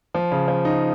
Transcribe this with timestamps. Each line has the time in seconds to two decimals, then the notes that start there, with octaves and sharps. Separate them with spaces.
0.14 F3
0.32 C#3
0.48 F3
0.65 D#4